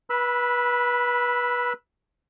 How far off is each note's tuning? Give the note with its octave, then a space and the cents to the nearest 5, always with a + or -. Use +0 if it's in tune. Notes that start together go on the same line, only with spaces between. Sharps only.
B4 -25 B5 +0 E6 +0